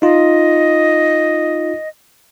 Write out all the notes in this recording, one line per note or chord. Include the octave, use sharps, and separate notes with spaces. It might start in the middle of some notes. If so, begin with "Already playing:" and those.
D#4 F4 D#5